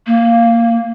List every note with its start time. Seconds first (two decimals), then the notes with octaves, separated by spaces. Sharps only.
0.07 A#3